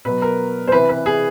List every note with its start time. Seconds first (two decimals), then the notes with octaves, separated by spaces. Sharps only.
0.05 B2 F#3 B4
0.22 A#4
0.68 C5
0.72 C3 E3 B4
0.89 B4
1.06 G#4